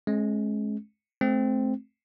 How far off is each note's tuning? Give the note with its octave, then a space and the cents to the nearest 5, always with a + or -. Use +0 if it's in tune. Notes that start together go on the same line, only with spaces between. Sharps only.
G#3 +30 C#4 -30
A3 -30 C4 +0